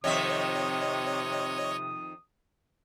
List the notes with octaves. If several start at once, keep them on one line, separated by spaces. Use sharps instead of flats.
F2 C3 D#3 C#5 D#5 E5 D#6